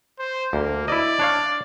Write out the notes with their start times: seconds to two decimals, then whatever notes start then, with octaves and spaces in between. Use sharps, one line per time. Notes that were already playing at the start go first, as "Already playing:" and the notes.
0.19 C5
0.53 D2 A#3
0.88 E4 D5 D#5
1.19 D4 C#5 F5